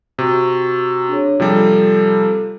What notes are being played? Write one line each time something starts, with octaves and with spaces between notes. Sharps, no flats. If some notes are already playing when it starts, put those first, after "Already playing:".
C3 F#4 C#6
D4 G#4 C#5
C3 F3 G3 F4 A4